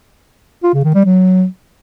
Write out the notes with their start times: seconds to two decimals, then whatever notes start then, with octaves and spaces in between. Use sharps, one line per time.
0.63 F4
0.74 C#3
0.84 D#3
0.95 G3
1.05 F#3